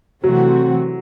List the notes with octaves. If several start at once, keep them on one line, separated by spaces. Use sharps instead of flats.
C3 E3 F#3 A3 C4 F#4